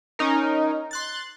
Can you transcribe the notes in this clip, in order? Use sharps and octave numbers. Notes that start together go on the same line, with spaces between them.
C#4 D#4 A#4
C6 F#6 A6